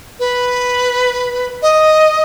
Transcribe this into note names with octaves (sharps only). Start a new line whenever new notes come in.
B4
D#5